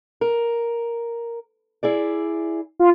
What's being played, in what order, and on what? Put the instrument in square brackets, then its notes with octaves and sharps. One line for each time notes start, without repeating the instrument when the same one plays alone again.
[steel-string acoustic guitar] A#4
E4 G#4 D5
[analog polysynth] F4